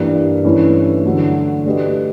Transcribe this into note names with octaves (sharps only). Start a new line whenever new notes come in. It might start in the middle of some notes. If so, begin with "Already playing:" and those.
Already playing: G2 E3 G3 A#3
G2 E3 A3 C#4 E4
D3 F#3 A3
A3 D4 G4 B4 D#5